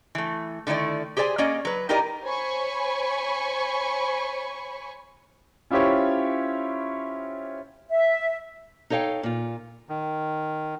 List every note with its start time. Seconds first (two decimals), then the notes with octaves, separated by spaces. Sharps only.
0.15 E3 A3
0.67 D3 D#3 A3 E4 D5
1.17 G4 G#4 C5 D5 G#5
1.38 A#3 C#4 D5 D#5
1.65 F#3 B4
1.89 D#4 E4 G4 A#4 D5 D#5
2.24 C5 C#5 G#5 B5 C#6
5.70 C#4 E4 F4 G4 C5 C#5
7.90 E5
8.90 D#4 A4 C#5 F5 G5
9.23 A#2 F4
9.89 D#3